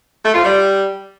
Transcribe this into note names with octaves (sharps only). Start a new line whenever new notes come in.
A3
F4
G3